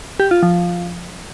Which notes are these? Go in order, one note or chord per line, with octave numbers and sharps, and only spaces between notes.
G4
F4
F3